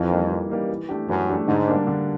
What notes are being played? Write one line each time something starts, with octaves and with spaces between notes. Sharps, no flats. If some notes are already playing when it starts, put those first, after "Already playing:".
Already playing: F2 E3
G3 A#3 D#4
E3
G3 A#3 D#4
E3
A3 D4 G4
F#2 E3
A3 D4 G4
G#2 D3
G3 A#3 D4
D3